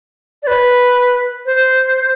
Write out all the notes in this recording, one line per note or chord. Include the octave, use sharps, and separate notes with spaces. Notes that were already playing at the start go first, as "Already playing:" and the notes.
D5
B4
C5